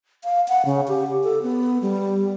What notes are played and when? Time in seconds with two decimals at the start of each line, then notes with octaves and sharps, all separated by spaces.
0.24 F5
0.48 F#5
0.65 C#3
0.88 G4
1.24 A4
1.42 B3
1.82 G3